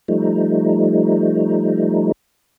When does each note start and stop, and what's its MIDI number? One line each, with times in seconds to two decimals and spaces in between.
0.08 2.12 53
0.08 2.12 55
0.08 2.12 57
0.08 2.12 63